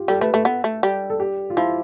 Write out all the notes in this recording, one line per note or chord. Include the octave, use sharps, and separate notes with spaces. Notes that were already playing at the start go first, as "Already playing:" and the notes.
Already playing: F4 G4
G3 A4
A3 B4
A3 A4
B3
A3
G3
A4
G4
F4
F3 E4